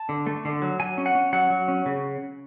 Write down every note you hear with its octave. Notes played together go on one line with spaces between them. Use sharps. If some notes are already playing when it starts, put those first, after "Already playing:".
Already playing: A5
D3
A3
D3
F#3
F#3 G#5
C#4
F#5
C#4
F#3 F#5
F#3
C#4
C#3